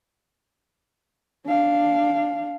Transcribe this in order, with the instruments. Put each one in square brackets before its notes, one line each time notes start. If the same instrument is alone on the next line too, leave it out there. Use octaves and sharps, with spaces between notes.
[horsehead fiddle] D4 F5